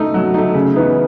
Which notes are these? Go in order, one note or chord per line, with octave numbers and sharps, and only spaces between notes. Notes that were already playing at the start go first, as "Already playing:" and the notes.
Already playing: A3 D#4
F#3
A3 D#4
C#3
E3 B3 D#4